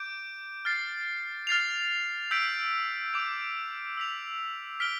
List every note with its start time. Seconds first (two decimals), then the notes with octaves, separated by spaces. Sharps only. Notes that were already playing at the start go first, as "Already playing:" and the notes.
Already playing: D6 G6 D7
0.65 F6 A6 C7
1.47 F6 A6 C7 F7
2.31 E6 G6 B6 D7
3.14 D6 G6 D7 F7
3.97 E6 B6 F7
4.80 F6 B6 D7 G7